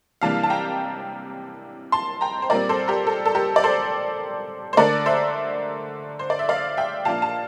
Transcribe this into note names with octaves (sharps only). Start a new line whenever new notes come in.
C3 E3 G3 A#3 D4 F5 A5
A5
G5 A#5
A5 C6
G5 A#5
C5
A#2 G3 C4 A#4 D5
A4 C5
G4 A#4
A4
A4
G4 A#4
D5
A4 C5
C5
D3 A3 D4 A#4 D5
C5 E5
C5
D5
E5
D5 F5
E5 G5
A#2 F3 A#3 D4 F5 A5
A5